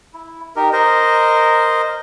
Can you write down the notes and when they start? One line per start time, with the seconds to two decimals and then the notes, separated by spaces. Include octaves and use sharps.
0.14 E4
0.56 D#4 G4 A#4
0.73 A#4 C5 D#5